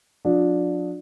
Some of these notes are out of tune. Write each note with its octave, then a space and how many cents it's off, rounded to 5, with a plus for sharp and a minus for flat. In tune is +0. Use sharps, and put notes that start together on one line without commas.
F3 +40 D4 +0